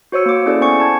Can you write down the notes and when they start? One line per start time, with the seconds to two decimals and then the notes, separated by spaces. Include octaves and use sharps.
0.12 F#4 C5 C#5 E6 C#7
0.26 A#3 D6
0.46 C#4 E4 G#4 A4 D5
0.61 B3 C5 G#5 C#6 C#7
0.80 A5 G#6